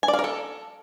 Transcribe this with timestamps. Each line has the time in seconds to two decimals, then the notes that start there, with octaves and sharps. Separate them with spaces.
0.03 G#5
0.08 D5
0.13 F5
0.19 A#4
0.24 A4